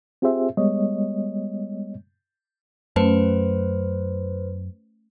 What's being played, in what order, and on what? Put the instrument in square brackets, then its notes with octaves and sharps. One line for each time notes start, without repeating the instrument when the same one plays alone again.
[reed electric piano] C4 F4 G4 G#4 C5 E5
G3 G#3 B3 C#5 D#5
[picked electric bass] F#2 [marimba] A3 C#4 [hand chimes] B4 C5